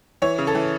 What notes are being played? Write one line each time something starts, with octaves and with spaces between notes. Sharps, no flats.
E3 C#5
C#3
A4
E3